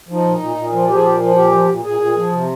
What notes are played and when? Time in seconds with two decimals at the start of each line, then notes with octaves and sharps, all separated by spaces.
0.09 F3 D#4
0.25 A#2
0.40 A#2
0.56 A#2
0.72 F3
0.88 F3 G4
0.95 G#4
1.03 A#2 G4
1.20 F3
1.36 A#2 G4
1.52 F3
1.69 A#2
1.84 A#2 G#4
2.00 A#2
2.16 F3
2.32 C3